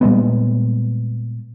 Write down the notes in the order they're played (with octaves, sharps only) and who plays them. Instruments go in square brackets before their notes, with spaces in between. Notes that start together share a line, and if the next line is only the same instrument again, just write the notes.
[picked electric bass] A#2 G3 G#3 B3